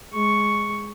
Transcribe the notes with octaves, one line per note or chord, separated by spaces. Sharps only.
G#3 C#6